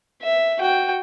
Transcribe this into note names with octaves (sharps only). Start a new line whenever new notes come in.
E5
F#4 G5